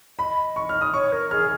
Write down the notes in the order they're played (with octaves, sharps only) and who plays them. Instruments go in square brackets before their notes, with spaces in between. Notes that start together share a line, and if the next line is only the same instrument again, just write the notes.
[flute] D#5 [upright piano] B5
[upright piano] C#6
F6
D#6
[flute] C#5 [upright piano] C#6
[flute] A#4
[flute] G#4 [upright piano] F6